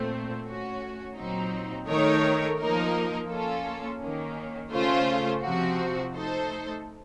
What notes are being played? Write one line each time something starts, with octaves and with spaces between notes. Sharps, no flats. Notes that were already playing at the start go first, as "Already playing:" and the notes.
Already playing: A#2 A3 C4
A3 C#4 F#4
A#2 F#3 C4 D#4
D#3 A3 D#4 A#4 C#5
F3 A#3 D#4 A#4
A#3 C#4 F4 A4
D#3 A#3 C#4
C#3 A3 C#4 F4 C5
C3 F3 C4 F#4
A3 D#4 A4 C5